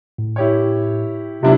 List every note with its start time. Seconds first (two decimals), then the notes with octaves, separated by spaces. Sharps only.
0.18 A2
0.36 E4 G4 C#5
1.43 C3 F#3 B3 D4 E4 F4